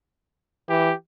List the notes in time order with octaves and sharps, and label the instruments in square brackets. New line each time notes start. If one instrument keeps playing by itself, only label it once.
[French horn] E3 [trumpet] G4